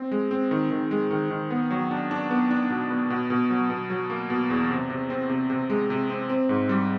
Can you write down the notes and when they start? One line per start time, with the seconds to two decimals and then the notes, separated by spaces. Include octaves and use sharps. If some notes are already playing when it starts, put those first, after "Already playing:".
Already playing: C4
0.11 G#3
0.31 C4
0.51 D#3
0.71 D#3
0.91 G#3
1.11 D#3
1.30 D#3
1.50 B3
1.70 F#3
1.91 D4
2.11 D4
2.31 B3
2.51 D4
2.70 B2
2.90 B3
3.10 B2
3.30 B2
3.50 F#3
3.70 B2
3.90 F#3
4.10 A#3
4.30 B2
4.50 E2
4.70 C3
4.90 C3
5.10 C4
5.30 C3
5.50 C3
5.70 G#3
5.90 C3
6.10 C4
6.30 C4
6.49 G#2
6.69 G3